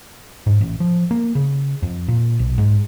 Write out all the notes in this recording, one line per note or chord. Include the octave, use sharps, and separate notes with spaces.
G#2
A1
F3
A#3
C#3
F2
A#2
B1
G#2